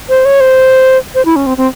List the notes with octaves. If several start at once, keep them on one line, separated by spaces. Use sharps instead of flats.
C5
C#5
C5
C5
E4
C#4
C4
C4